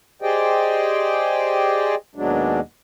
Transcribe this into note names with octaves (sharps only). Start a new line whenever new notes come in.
G4 G#4 C5 D5 D#5 G5
D#2 B2 F#3 G#3 D4